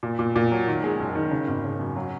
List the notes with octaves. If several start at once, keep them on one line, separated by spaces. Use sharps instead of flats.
A#2
A#2
A#2
F#3
D#3
G#3
F#1
D#3
C#3
G#1
C#3
F#2
F#3